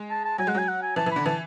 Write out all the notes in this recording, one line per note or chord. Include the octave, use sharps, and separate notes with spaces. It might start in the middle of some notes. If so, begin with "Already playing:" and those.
Already playing: G#3
A5
A5
F#3 G#5
G#3 F#5
F#3 G#5
F#5
G#5
E3 A5
E3
D3 B5
E3 A5